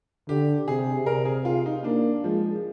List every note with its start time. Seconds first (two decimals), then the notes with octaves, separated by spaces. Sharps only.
0.28 D3 G4
0.67 C3 G#4
1.06 C3 A#4
1.25 G#4
1.45 F4
1.66 D#4
1.84 A#3 D4
2.24 F3 G#3